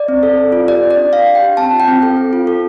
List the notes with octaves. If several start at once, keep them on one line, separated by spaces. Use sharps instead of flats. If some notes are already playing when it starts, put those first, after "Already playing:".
Already playing: D5
C4
A4
C4
F4
G4 D5
G4
D5
D4
D4 F5
G4
G5
G4
C4 A5
F4
G5
C4
A4
C4
F4
A4